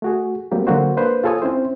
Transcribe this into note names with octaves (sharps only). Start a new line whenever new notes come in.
A3 F#4 G#4
F#3 G3 A3 A#3 C4 G4
D3 F#3 G#3 A#3 F#4 C5
A#3 D4 B4 C5
F4 G#4 A4 C#5 G#5 D#6
C4 C#4 E4 C5